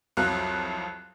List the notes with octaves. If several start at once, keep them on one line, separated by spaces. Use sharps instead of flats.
C2 F2 F#3 F5 F#6